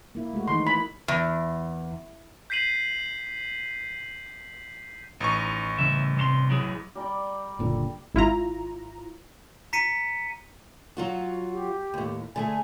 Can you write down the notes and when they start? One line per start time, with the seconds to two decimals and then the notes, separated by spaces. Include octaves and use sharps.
0.15 A#3 E4
0.33 G#3 A3 F#4
0.48 D#3 E3 D#4 C6
0.67 B5
1.08 E2
2.50 G6 B6 C7 D#7 F#7
5.21 A1 D#4 C#6
5.79 C#3 G3 A3 E5
6.17 G2 C3 A4 C6
6.49 F#3 E4 G#4
6.95 G3 A#4 D5
7.59 F#1 A#2 D3
8.14 G#1 E4 F4 A#5
9.73 A#5 B6 C#7 D#7
10.97 F#3 F4 F#4
11.53 G4
11.94 D#2 A2
12.36 D3 A3 G#4 G#5